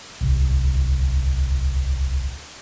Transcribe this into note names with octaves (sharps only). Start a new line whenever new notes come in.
D1 C2